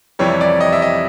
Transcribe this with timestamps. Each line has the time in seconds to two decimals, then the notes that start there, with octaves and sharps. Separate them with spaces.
0.19 F2 C3 E3 G3 C#5
0.41 D5
0.61 D#5
0.72 E5
0.82 D#5